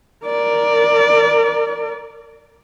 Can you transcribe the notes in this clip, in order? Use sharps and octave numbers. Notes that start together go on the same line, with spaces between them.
A#4 D5